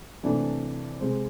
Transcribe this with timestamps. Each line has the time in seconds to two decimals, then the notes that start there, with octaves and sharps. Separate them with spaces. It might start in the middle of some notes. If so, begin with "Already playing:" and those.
0.23 C3 E3 A3 D4
1.00 C3 G#3 C4